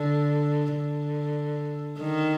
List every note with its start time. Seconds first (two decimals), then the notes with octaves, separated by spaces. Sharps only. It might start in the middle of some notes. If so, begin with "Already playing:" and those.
Already playing: D3
0.76 D3
2.00 D#3